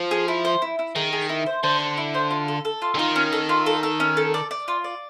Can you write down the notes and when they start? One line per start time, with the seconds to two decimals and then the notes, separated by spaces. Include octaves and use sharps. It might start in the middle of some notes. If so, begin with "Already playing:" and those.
Already playing: F3
0.11 G#4
0.28 E4
0.45 C5
0.62 E4
0.79 E4
0.95 D#3 G#4
1.13 G#4
1.29 E4
1.46 C5
1.63 D3 C5
1.80 C5
1.97 E4
2.14 C5
2.31 F4
2.48 A4
2.65 A4
2.82 F4
2.95 D3
2.98 D#3 F4
3.16 C#4
3.33 A4
3.49 F4
3.66 A4
3.83 A4
4.00 C#4
4.17 A4
4.34 D5
4.51 D5
4.68 F4
4.84 D5